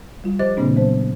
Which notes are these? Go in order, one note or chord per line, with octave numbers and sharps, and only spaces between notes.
G3 F4
F3 G4 C5 D#5 D6 A6
A#2 C#3 E3 A#3 C4 D4
F#3 B3 C5